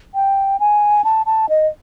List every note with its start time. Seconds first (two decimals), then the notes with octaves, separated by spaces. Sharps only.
0.15 G5
0.60 G#5
1.04 A5
1.26 A5
1.49 D#5